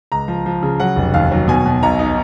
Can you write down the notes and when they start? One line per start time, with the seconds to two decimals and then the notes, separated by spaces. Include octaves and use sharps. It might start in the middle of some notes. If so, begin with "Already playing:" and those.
0.12 C#2 A#5
0.28 F3
0.46 F3
0.63 C#3
0.80 F#3 F#5
0.96 F1
1.14 D#2 F5
1.32 F#3
1.48 B2 G#5
1.66 B2
1.83 B1 A#5
1.99 D#4